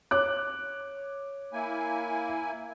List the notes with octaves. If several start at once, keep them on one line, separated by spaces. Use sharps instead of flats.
C#5 D6 F#6
A#3 E4 G#5